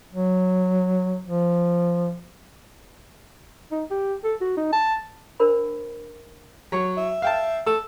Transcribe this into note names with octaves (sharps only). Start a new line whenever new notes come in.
F#3
F3
D#4
G4
A4
F#4
D#4
A5
D4 A#4 C5 A5 B5
F#3 C#5
E5
F5 G5 A5
A4 E6